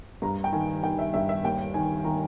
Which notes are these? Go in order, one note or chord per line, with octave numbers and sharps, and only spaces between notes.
G2 A#5
G5
D#3 G#5
D#3 G5
E5
G2 E5
E5
D#2 G5
D#3 G#5
D#3 A#5